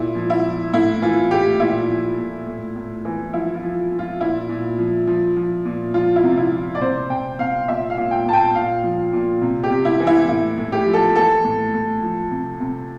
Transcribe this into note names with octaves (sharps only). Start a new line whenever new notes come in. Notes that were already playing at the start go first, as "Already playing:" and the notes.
Already playing: A#2 E4
F3
E4
F3
A2 E4
E3 F4
A2 G4
A#2 E4
F3
A#2
A2
A2
E3
F3 E4
F4
F3
F3
F4
A#2 E4
A#2
F3
F3
F3
A#2
F3 F4
E4
C3
E4
F3
D5
C3 C5
C3 G5
C3 F5
A#2 E5
F5
A#2
G5
A#2 A5
G5
A#2 F5
F3
A#2
C3
G4
C3
E4
E3
E4
A2 E4
A2
G4
F3
A4
E3 A4
A2
A2
F3
C3
C3